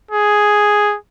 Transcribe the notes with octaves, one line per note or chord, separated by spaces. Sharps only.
G#4